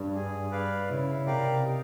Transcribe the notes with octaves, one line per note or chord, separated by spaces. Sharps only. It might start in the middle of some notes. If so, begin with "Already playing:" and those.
Already playing: G2
G#4
B4 D5 F5
C#3 E4
C3 G4 A#4 D5 F5
D#4